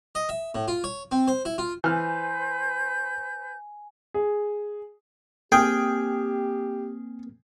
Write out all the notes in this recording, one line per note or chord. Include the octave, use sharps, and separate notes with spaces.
D#5
E5
A2
F4
C#5
C4
C5
E4
F4
E3 B4 C5 G#5 F6 G6
G#4
A#3 C4 G4 G#4 G5 F6